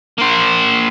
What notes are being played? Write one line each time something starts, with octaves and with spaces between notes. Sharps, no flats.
A#3 C5